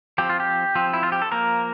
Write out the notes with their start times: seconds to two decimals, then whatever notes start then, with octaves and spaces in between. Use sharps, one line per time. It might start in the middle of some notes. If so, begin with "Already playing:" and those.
0.18 F3 C4 G4
0.30 F4
0.40 G4
0.75 F3 C4
0.93 E4
1.03 F4
1.12 G4
1.22 A4
1.31 F3 A#3 A#4